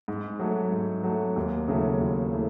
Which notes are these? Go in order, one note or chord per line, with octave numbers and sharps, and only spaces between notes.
G#2
F#3 A3
G#2
F#3 A3
D#2
C#3 F#3 A3 E4
D#2
A3 E4